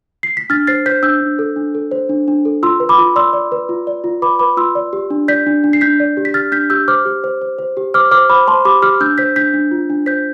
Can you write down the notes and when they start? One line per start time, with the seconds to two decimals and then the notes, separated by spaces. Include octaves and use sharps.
0.23 C7
0.37 B6
0.50 D4 F6 A6
0.67 C5 A6 C7
0.86 C5 G6 B6
1.03 D4 E6 G6
1.21 D4
1.39 A4
1.56 D4
1.75 A4
1.91 C5
2.09 D4
2.28 D4
2.45 A4
2.63 F4 C6 E6
2.80 B4
2.89 B5 D6
2.98 F4
3.16 D5 C6 E6
3.33 D5
3.52 B4
3.69 F4
3.87 D5
4.04 F4
4.22 B4 B5 D6
4.39 B4 B5 D6
4.57 F4 C6 E6
4.75 D5
4.93 G4
5.10 D4
5.28 D5 G6 B6
5.47 D4
5.64 D4
5.73 C7
5.81 D4 G6 B6
6.00 D5
6.17 G4
6.25 B6
6.34 G4 F6 A6
6.52 D4 G6 B6
6.70 G4 E6 G6
6.88 C5 D6 F6
7.05 G4
7.24 C5
7.42 C5
7.59 C5
7.77 G4
7.94 C5 D6 F6
8.11 C5 D6 F6
8.30 C5 B5 D6
8.47 C5 A5 C6
8.65 G4 B5 D6
8.82 G4 D6 F6
9.00 D4 E6 G6
9.18 C5 G6 B6
9.36 D4 G6 B6
9.54 D4
9.71 F4
9.90 D4
10.06 C5 G6 B6